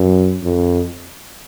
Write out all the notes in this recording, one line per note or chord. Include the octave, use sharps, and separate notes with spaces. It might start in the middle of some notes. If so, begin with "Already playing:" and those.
Already playing: F#2
F2